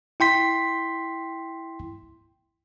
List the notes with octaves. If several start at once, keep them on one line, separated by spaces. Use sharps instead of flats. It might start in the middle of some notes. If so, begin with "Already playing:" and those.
E4 G5 C6 B6